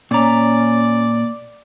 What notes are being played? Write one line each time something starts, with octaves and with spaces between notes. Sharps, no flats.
A#2 C#4 D5 A#5